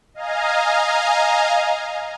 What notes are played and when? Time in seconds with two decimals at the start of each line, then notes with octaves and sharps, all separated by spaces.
0.14 D#5 F5 G#5 A#5